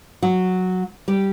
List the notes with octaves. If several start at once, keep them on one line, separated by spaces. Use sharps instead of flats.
F#3 F#4
G3 G4